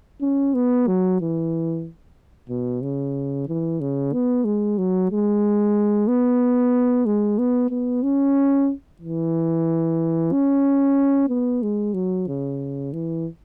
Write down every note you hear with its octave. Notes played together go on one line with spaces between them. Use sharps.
C#4
B3
F#3
E3
B2
C#3
E3
C#3
B3
G#3
F#3
G#3
B3
G#3
B3
B3
C#4
E3
C#4
B3
G#3
F#3
C#3
E3